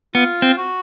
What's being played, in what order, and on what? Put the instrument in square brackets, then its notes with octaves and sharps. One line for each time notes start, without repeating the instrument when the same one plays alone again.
[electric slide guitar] B3 [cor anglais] F4
[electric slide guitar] C4
[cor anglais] F#4